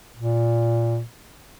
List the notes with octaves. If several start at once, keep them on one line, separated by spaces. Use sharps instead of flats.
A#2